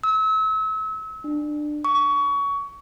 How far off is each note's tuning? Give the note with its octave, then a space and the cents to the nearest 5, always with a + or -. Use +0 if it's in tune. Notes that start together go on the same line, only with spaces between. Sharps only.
E6 -35
D4 +25
C#6 +25